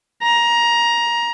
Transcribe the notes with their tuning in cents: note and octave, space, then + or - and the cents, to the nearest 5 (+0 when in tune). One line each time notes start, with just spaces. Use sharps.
A#5 +15